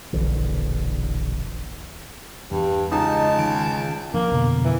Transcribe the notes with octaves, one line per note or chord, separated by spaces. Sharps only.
E1 A#1 D3 E3
E2 G2
C#2 D#4 A5
D#3 D7
F3 A#3 D4
F2 B2 D3
E3